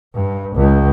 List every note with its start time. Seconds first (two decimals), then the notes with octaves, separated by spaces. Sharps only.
0.14 G2
0.55 C#2